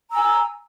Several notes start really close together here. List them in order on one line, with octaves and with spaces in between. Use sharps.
A#5 E6 G#5